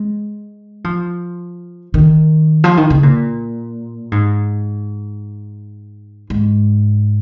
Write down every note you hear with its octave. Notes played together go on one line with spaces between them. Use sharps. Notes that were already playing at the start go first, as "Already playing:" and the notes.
Already playing: G#3
F3
D#3
F3
D#3
C#3
A#2
G#2
G#2